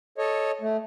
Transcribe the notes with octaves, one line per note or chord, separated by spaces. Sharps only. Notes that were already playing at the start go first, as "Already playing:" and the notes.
A4 C#5 D#5
A3